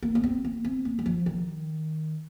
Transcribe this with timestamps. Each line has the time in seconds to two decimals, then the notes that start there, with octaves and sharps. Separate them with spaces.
0.03 A#3
0.15 A#3
0.24 C4
0.44 A#3
0.65 C4
0.85 A#3
0.99 F#3
1.06 F3
1.26 D#3